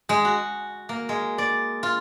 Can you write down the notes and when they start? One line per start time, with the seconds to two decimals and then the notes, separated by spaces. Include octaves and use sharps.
0.09 G#3
0.25 F#4
0.89 A#3
1.09 G#3
1.38 D5
1.83 F4